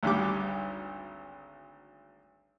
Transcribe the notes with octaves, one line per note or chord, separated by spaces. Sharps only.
G#1 D2 G3 D6